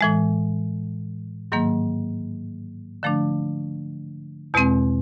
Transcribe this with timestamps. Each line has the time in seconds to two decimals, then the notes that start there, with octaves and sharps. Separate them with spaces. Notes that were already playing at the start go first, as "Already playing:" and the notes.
0.01 A2 E3 G#3
1.52 G#2 D#3 F#3 A#3
3.03 D3 F3 A3 D4
4.54 E2 B2 G#3 C4